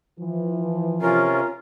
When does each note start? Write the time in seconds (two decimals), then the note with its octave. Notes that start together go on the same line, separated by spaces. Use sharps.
0.19 E3 F3
1.01 C3 C#4 F4 A#4